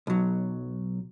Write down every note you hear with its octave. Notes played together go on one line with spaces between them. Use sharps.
B1 F#3